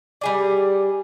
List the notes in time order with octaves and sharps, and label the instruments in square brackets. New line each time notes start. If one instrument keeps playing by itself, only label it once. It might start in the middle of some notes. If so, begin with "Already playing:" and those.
[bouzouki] G3 G#4 D5